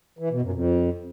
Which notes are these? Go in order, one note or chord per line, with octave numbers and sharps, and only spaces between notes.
E3
B2
F#2
F2